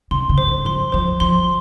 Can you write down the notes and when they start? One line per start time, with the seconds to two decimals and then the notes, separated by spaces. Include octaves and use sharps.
0.11 C3 C6
0.29 C#3
0.38 C5
0.48 D#3
0.65 F3 C6
0.92 F3 C5
1.20 F3 C6